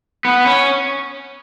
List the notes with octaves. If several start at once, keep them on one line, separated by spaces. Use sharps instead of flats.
B3
C#4